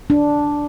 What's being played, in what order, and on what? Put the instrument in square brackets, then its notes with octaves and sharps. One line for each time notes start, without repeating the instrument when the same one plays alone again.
[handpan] D4